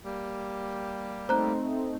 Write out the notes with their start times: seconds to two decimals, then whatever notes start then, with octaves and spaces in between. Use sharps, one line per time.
0.05 G3 A#3 G4
1.29 A3 C4 D#4 C5 A#5 F#6